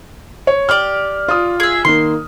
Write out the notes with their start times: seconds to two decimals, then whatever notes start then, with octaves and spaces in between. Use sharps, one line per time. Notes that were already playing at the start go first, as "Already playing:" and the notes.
0.47 C#5
0.69 G4 D5 F6
1.28 F4 D#6
1.60 G#4 E5
1.85 D#3 A#3 C6